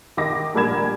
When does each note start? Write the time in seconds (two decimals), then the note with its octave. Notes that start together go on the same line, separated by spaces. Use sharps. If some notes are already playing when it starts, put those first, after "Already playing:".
0.17 D#3 D#5 D6 A#6
0.55 A#1 G3 A#4 B5 G#6 E7